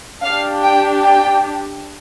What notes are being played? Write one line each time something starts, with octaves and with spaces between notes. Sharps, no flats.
D4 G4 F5
G5
G5